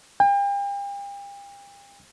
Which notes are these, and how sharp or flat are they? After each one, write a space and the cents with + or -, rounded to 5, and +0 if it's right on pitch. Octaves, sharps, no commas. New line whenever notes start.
G5 +40